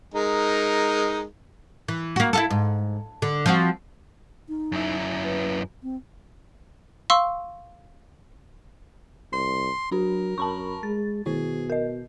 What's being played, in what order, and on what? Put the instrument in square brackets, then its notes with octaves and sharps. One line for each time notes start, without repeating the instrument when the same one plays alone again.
[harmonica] G#3 D#4 A#4
[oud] E3
A#3 F#4
E4 F4 A4
G#2
D3
F3 C4 F#4
[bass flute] D#4
[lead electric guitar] F#2 E4
[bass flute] B4
C4
[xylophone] F5 C6 C#6 E6
[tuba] C2 [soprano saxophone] C6
[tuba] F#3 [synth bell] D4 F#4 [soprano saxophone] A#4
[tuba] F#2 [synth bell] A5 B5 C#6
[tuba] G#3 [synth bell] A6
[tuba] B2 [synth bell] D#3 E4 [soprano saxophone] G#4
[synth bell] A#4 D#5